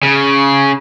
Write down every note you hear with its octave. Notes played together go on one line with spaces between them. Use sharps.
C#3